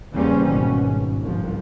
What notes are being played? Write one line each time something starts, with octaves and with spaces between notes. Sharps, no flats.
E2 C#3 G3 A#3 C4 C#4
G#1 B2 C#4
G#1
G1 C2 F3